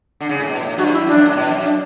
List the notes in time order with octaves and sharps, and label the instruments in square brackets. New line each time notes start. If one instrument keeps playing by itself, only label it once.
[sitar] D3
C#3
A2
B2
A2
[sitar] G2 [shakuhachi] F#4
[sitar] F#2 [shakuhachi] E4
[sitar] F#2 [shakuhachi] D4
[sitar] G2
A2
B2
F#2
[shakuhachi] D4